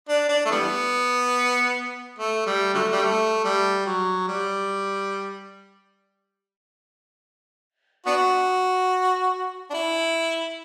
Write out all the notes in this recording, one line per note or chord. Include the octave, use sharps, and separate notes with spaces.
D4
D4
A3
E3 G3 B3
A3
G3
D3 F#3 A3
G3
A3
G3
F#3
G3
B3 D4 F#4
D4
E4